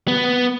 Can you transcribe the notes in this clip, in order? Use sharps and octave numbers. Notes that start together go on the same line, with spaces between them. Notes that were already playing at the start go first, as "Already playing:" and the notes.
B3